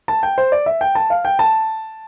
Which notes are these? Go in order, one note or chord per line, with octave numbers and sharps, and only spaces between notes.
A5
G5
C5
D5
E5
G5
A5
F5
G5
A5